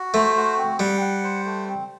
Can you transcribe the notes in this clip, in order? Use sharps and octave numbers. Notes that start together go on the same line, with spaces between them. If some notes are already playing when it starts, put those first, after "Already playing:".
Already playing: F#4
A3 C5
F#4
C4
G3 F#5
F#5
C5
A3
C4